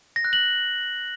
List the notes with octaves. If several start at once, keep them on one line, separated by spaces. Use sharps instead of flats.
A#6
F#6
F#7